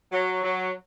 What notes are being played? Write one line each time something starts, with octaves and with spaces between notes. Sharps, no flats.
F#3
F#3